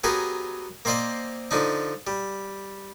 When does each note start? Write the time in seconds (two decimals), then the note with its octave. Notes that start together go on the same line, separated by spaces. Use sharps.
0.04 F#3 B3 G4 G#4 A#4
0.85 A#3 C4 C5 D5 D#5 F5
1.51 D3 F3 D4 D#4
2.07 G3